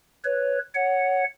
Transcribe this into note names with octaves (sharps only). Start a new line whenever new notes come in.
B4 C#5
C#5 F#5